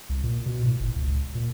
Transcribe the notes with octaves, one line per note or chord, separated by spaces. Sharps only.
C2
A#2
B2
A2
F#1
C#2
A#2